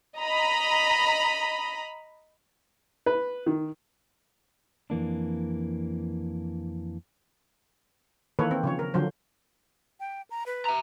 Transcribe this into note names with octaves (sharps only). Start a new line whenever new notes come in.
D#5 A#5 B5
B4
D#3
F2 E3 A#3 D4
D#3 E3 A#3 A4 B4 C#5
C4
C#3 F3 C#5
A#4
D3 F3 F#3 C5
G5
A#5
B4
E5 A#5